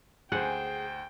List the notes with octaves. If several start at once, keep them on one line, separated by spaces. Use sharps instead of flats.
D2 G#4 C5 F#5 G5